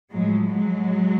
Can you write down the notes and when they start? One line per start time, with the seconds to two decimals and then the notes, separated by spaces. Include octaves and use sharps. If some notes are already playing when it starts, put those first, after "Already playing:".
0.11 A2 F3 F#3 G#3
0.48 F#3 G#3